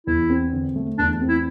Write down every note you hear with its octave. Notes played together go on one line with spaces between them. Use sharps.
E2 E4
C4
D3
A3
E2 D4
C4
E4